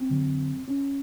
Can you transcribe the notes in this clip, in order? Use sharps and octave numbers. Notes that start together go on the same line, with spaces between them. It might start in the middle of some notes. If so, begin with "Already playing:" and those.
Already playing: C4
F2 D3 F#3
C#4